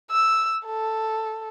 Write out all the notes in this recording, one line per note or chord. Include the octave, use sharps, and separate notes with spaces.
E6
A4